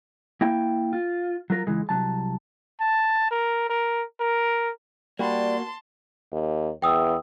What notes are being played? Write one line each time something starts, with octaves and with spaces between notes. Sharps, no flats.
A#3 E4 E5 G5
F4
F#3 F4 A#4
C#2 E3 G#3
C2 F3 F#3 A5
A5
A#4
A#4
A#4
G3 A#3 F#4 D5 A5 C6
D#2
E2 G5 D#6 E6